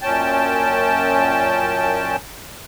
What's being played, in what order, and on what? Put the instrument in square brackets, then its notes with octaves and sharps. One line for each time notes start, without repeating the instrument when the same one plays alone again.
[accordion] F#2 A#2 C#4 G5 A5